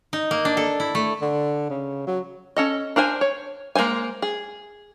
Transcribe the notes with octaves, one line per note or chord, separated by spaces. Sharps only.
D#4
A#3
D4
A4
E4
A3
D3
C#3
F#3
C#4 A4 D#5
D4 A#4 C5 G#5
C#5
G#3 A#3 G#4 C5 G#5
G#4